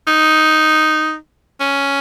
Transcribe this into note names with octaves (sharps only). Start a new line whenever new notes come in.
D#4
C#4